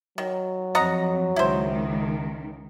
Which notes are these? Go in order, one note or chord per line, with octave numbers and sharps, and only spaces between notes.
D#3 F#3
F2 D#5 F#5 A#5
C#2 D#3 E4 C5